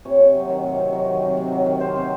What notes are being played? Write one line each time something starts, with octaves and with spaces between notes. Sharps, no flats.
C3 C#5
C3
F#3
D#3
C3
C3
F#3
D#3
C3
C3
F#3
D#3
C3 C5
C3